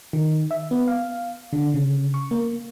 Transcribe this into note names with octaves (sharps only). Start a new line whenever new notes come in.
D#3
E5
B3
F5
D3
C#3
C#6
A#3